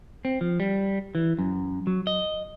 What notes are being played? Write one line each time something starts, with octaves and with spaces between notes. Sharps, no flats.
C4
F3
G3
E3
F#2
F#3
D#5